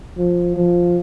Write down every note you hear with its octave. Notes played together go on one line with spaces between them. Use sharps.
F3
F3